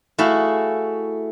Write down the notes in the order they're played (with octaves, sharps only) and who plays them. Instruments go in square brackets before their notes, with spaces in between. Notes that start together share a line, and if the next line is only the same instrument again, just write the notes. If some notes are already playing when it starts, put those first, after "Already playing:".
[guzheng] A3 E4 F#4 G#4 F5